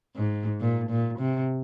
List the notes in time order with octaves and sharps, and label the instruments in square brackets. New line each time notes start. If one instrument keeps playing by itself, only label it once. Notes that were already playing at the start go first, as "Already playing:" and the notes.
[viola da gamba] G#2
A#2
A#2
C3